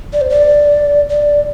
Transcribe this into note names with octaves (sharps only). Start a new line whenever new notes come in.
D5
C5
D5
D5